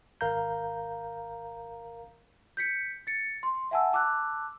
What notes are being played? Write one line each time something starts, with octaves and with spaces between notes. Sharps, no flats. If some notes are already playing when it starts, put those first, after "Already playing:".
G#1 A#4 F5 A#5 G6
G6 B6 C#7
A6 C#7
C6
E5 F#5 G#5 A5 E6
A5 D6 E6 F#6